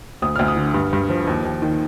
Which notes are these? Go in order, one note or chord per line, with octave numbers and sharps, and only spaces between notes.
D2 D#6
D2 F6
D#6
D3
G2
G2
F3
D#2
D#2
D#3